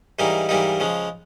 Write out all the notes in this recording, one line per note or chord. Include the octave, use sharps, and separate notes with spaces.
G#2 E3 G3 A#3 D#4
G#2 E3 G3 A#3 D#4
C#3 F3 G#3